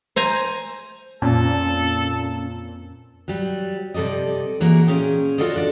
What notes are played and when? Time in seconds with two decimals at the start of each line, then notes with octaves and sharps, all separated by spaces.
0.16 C5 G#5 A#5
1.22 F2 A#2 C4 C#4 A4
3.28 F#3 G3
3.94 C3 G3 A4 D5 D#5
4.60 E3 A#3 F#4 G#4 A#4
4.87 A#2 C#4 G#4 G5
5.38 F4 F#4 A4 D5 D#5
5.56 D4 D5